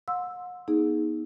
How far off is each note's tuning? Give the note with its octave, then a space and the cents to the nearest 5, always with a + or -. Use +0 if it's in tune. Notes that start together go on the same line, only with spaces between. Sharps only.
F#5 -45 C6 +0 E6 +0
B3 -35 D#4 +20 G#4 +0